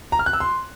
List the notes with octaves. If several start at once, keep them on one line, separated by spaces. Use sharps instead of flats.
A#5
F6
F#6
E6
C6